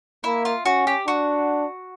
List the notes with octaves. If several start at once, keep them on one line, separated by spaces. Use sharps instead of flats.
A#3 E4
F4
C#4 F#4
G4
D4 F#4